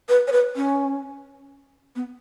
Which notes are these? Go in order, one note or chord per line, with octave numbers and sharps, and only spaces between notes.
B4
C#5
B4
C#4
B3